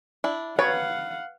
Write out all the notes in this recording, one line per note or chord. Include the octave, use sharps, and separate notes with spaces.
D4 E4
B4 C#5 F5 F#5